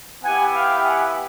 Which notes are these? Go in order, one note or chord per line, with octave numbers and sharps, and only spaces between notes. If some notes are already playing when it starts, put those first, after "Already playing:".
B3 E4 G4 F#5 G#5
F5 G5
F#5 G#5